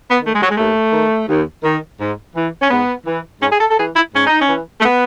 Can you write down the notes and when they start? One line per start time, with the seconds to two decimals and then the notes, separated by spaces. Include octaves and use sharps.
0.09 B3
0.22 D#3 A3
0.34 G#3
0.42 F#3
0.50 G#3
0.57 D#2 A3
0.93 D#3
1.28 D#2
1.63 D#3
1.99 G#2
2.34 E3
2.60 C#4
2.70 G#2 B3
3.06 E3
3.41 G#2 C#4
3.51 G#4
3.59 A4
3.70 A4
3.78 E3 G#4
3.96 E4
4.12 G#2 C#4
4.27 D#4
4.40 C#4
4.48 E3
4.80 A3
4.84 B3